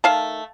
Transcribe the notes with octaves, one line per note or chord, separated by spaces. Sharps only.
D#3 A3 F5 A5